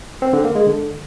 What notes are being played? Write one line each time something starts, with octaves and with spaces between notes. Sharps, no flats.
C4
D3
A#3
G#3
D3